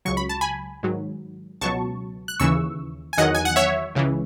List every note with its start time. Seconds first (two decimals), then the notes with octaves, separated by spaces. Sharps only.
0.05 C#2 C#3 F#3 C#6
0.17 B5
0.29 A5
0.41 G#5 B5
0.83 G#2 D#3 F#3
1.61 C#2 B2 F#3 A5 C#6
2.28 F#6
2.40 D#2 C#3 E3 C#6 E6
3.13 G#5
3.18 E2 D#3 F#3 D#5 F#5
3.35 G#5
3.45 F#5
3.56 C#5 E5
3.95 C#2 C#3 E3